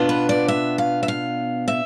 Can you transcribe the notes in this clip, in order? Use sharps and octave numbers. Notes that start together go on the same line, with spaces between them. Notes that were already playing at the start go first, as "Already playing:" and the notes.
Already playing: B2 B3 D4 F4
B4
D5
E5
F5
E5
F5
E5